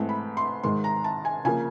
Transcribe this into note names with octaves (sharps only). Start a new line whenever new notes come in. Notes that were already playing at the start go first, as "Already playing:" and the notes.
Already playing: G#2 E3 A3 C4
B5
C6
G#2 D#3 G#3 C6
A#5
A5
G#5
C#3 F3 A#3 G#5